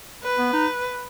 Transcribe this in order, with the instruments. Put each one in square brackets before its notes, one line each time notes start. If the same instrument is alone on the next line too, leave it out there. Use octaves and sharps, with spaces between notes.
[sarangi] B4
[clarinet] B3
D#4